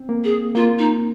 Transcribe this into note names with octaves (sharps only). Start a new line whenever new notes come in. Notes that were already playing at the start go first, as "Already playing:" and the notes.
Already playing: C4
A#3
G#4
A#3 F4
D#4